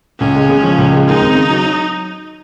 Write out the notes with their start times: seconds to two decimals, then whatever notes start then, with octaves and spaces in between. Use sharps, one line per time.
0.19 C#2 C#4
0.35 G#3
0.49 C#3
0.63 F3
0.78 C#2
0.92 G#3
1.07 D#2 D#4
1.21 C4
1.35 C#3
1.49 F#3